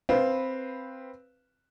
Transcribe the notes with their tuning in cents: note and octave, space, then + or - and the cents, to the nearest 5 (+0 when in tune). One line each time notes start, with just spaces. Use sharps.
C4 +0 B4 +0 F5 -10